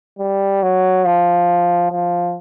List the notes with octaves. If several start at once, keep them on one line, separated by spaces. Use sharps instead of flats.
G3
F#3
F3
F3